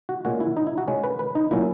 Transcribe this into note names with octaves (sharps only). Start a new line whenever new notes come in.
F#4
A#2 G#3 C#4 F#4
E4
D#4
E4
F#4
C#3 G#3 C#4
B4
B4
D#4
A#2 F#3 C#4 E4